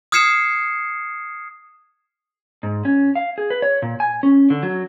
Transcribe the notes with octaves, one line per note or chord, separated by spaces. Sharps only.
D#6 F6 G#6 C7 C#7 E7
G#2
C#4
F5
G#4
B4
C#5
A#2
G#5
C#4
D3
F#3